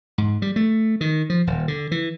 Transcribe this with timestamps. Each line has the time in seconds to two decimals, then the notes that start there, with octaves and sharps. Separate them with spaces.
0.18 G#2
0.42 G3
0.56 A3
1.01 D#3
1.30 F3
1.47 D#1
1.68 D3
1.91 E3